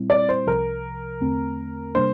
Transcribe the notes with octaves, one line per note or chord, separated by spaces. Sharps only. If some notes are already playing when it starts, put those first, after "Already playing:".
Already playing: A#2 G3 C4 E4
D5
C5
C2 C3 F3 A#4
E2 D3 A3 C4
C3 G3 A#3 D4 C5